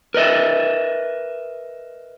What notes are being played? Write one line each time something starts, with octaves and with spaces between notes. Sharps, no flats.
A#4 B4 D#5 E5